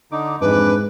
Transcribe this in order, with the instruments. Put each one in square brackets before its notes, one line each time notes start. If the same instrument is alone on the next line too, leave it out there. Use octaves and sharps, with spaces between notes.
[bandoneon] D3 D#4 [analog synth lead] D6
[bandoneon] F2 E3 D6 [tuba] G#2 [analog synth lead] D4 [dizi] B4